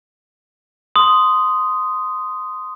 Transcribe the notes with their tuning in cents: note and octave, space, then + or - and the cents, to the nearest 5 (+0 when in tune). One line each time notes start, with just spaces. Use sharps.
C6 -10 D#6 +0